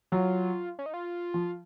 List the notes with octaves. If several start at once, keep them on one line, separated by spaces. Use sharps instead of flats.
F#3 F4
C#4
D#4
F4
F3